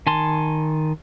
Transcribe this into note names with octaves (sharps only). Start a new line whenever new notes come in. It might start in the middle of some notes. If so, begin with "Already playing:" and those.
D#3 G#5 A5 C6